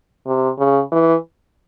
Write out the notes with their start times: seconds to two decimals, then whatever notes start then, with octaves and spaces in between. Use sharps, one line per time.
0.27 C3
0.59 C#3
0.92 E3